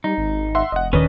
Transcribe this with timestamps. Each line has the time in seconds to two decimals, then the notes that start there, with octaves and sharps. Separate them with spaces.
0.04 G3 D#4
0.18 G#1
0.55 E5 F#5 C6
0.72 F1 D#5 F#5
0.93 D#1 D#3 C#4 D4 B4 D#5